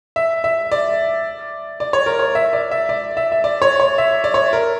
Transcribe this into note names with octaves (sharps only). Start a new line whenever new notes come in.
E5
E5
D5
D5
C#5
A#4
C#5
E5
D5
E5
D5
E5
E5
D5
C#5
C#5
E5
D5
C#5
A#4